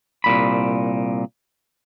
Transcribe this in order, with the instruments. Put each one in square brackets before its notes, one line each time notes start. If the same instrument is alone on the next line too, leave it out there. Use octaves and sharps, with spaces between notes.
[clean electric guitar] C2 A#2 B5